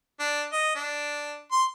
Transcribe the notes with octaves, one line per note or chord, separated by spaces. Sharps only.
D4
D#5
D4
C6